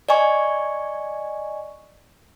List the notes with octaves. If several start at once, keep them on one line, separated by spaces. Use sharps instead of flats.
D5 D#5 G#5 C#6